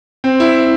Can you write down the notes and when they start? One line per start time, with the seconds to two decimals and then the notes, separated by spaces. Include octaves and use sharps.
0.24 C4
0.40 E4